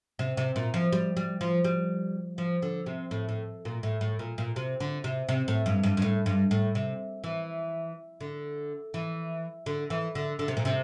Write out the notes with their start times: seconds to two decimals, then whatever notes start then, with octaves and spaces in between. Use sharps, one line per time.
0.19 C3
0.37 C3
0.56 A#2
0.74 F3
0.93 G3
1.17 G3
1.41 F3
1.64 G3
2.38 F3
2.63 D3
2.86 C3
3.11 A2
3.29 A2
3.65 A#2
3.83 A2
4.01 A2
4.19 A#2
4.38 A#2
4.56 C3
4.80 D3
5.04 C3
5.29 C3
5.48 A2
5.66 G2
5.83 G2
5.97 G2
6.02 A2
6.26 G2
6.51 A2
6.75 C3
7.24 E3
8.21 D3
8.94 E3
9.66 D3
9.90 E3
10.15 D3
10.39 D3
10.48 C3
10.57 A#2
10.65 C3